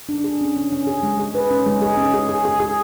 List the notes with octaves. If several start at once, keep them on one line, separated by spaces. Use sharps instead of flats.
D4
G#4
C#4
C#4
C#4
G#4
G#3
G#4
B4
C#4
G#3
G#4
C#4
G#4
G#4
G#4
G#4